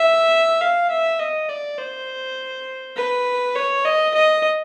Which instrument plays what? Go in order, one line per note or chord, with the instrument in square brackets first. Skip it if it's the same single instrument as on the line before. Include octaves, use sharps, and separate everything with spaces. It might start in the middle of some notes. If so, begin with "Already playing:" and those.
Already playing: [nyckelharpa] E5
F5
E5
D#5
D5
C5
B4
C#5
D#5
D#5